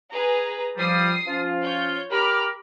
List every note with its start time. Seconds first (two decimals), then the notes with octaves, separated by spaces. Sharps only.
0.12 G#4 B4 A#5
0.77 F3 G3 D#6 C7
1.26 F3 C#4 F4
1.61 C#5 G6
2.11 G4 A#4 B5 D6 F6